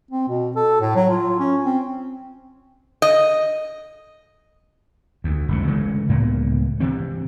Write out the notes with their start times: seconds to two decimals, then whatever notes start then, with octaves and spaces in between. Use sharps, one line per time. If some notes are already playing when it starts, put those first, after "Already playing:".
0.11 C4
0.29 B2
0.56 A4
0.81 A2
0.95 F#3
1.11 F4
1.40 C#4
1.65 C4
3.02 D#5
5.24 D2
5.48 F#1 C#2 C3
5.67 C#3 E3 G#3 A3
6.09 C#2 A2 A#3 B3
6.80 C3 E3 C4